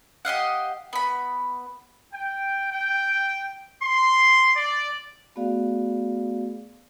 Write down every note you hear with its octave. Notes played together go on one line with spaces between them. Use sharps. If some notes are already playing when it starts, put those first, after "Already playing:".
G4 D#5 F5 F#5
B3 B5
G5
G5
C6
D5
A3 B3 F#4 G#4 D5 F5